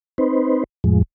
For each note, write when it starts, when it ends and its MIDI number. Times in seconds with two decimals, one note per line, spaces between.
0.18 0.64 60
0.18 0.64 63
0.18 0.64 71
0.18 0.64 72
0.84 1.02 41
0.84 1.02 45
0.84 1.02 53
0.84 1.02 56